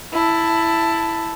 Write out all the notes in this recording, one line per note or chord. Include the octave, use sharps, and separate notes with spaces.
E4 A5